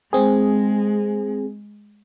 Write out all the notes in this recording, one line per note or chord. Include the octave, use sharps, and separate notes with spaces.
G#3 C4 G#4